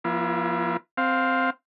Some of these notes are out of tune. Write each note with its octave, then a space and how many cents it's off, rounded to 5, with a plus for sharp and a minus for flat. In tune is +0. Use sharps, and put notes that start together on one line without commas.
F3 +0 B3 -45 E4 +30
C4 +0 F5 +15